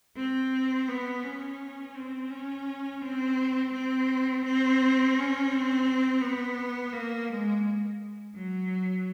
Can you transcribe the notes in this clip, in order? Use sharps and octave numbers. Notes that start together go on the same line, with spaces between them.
C4
B3
C#4
C4
C#4
C4
C4
C4
C#4
C4
B3
A#3
G#3
F#3